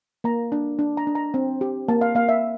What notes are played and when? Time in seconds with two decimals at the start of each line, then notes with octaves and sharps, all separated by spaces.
0.24 A#3 A#5
0.52 D4
0.79 D4
0.97 A#5
1.07 D4
1.15 A#5
1.34 C4
1.61 G4
1.88 A#3 A5
2.01 F5
2.15 A#3 F5
2.29 E5